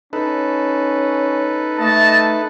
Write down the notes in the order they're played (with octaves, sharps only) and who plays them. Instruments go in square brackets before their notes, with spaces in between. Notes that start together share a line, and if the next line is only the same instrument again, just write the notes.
[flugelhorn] C#4 [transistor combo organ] D#4 A4 B4
[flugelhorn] A3 [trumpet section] D#5 A5